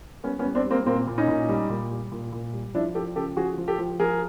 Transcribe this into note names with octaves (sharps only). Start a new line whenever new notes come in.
G3 B3 C#4
B3 C#4
G3
C4 D4
G3
A#3 C4
A#2 A#3 C4
A#2
C#4 D#4
A#2
G3
A#2
G3
A#2
A#2
G3
F3 D4 E4
F3 G4 A4
C#3 G4 A4
F3 F#4 G#4
F3
G4 A4
F3
F3 G#4 A#4